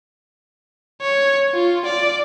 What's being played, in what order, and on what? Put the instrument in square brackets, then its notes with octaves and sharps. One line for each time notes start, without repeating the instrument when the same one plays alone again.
[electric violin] C#5
F4
D5